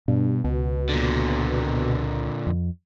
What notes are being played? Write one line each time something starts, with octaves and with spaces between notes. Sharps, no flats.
G2 B2
C#2 B2
A#2 D3
F2